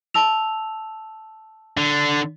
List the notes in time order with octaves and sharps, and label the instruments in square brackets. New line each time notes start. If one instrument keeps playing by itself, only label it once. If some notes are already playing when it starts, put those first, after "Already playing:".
[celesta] A5 E6 F7
[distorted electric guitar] D3